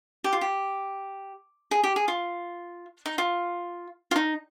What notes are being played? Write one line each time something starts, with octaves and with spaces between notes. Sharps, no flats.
G4
F4
G4
G#4
G4
G#4
F4
D#4
F4
F4
D#4